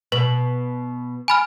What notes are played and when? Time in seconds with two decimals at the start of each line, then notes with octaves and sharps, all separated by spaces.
0.12 B2 B4
1.28 G#5 B5 F6